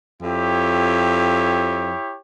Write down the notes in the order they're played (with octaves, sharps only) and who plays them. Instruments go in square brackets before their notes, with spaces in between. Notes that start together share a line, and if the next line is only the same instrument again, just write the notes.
[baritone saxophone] F2 [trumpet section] E4 G4 C#5